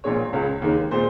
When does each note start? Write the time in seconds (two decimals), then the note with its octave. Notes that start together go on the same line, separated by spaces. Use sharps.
0.04 A#1 A#2 G#3 C#5
0.33 C#2 C#3 G#3 C#5
0.62 D#2 D#3 G#3
0.91 A#2 G#3 C5